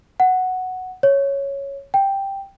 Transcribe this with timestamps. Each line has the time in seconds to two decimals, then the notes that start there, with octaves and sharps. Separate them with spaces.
0.20 F#5
1.03 C#5
1.94 G5